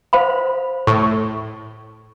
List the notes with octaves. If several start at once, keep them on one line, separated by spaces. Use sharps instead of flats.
C5 F5 B5
A2 C#6